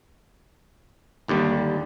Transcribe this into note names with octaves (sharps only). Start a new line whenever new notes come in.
G#1 D#2 D3 G3